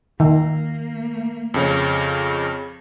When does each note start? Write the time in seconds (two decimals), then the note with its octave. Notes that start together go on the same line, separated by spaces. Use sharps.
0.20 D#3 A#3
1.54 F2 C#3 C#5